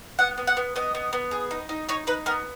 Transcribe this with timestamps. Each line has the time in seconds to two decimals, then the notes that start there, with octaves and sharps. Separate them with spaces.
0.19 B3 F#5
0.38 B3
0.47 F#5
0.57 B3
0.76 B3 D#5
0.95 B3
1.13 B3
1.31 G#4
1.51 D#4
1.69 D#4
1.89 D#4 C#5
2.07 D#4 B4
2.26 B3 A#4